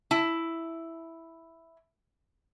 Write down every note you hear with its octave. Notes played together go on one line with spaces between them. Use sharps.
E4 A5